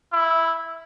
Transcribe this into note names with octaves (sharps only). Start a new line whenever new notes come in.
E4